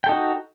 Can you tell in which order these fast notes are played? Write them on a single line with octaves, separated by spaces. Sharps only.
G5 A4 D#4 F#4